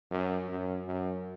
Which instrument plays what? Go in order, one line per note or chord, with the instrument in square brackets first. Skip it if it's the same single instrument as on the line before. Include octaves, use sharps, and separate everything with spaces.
[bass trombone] F#2
F#2
F#2